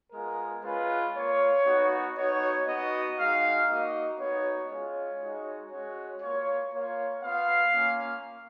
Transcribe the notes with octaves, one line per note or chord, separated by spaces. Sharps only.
G#3 B3 F4 A#4
G#3 C#4 F4 B4
A#3 F4 C#5
B3 D#4 F#4
B3 D#4 F#4 C#5
B3 D#4 F#4 D#5
G#3 D#4 F#4 F5
A#3 D#4 F#4 D#5
B3 D#4 F#4 C#5
G#3 C#4 F4 C#5
G#3 D#4 F#4
G#3 C#4 F#4 C#5
A#3 F4 C#5
A#3 F4 C#5
B3 F4 F5
A#3 C#4 F4